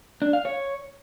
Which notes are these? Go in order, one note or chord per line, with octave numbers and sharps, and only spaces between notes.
D4
F5
C#5